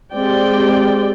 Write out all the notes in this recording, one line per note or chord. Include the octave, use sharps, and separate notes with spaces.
G#3 C4 G4 D5 G5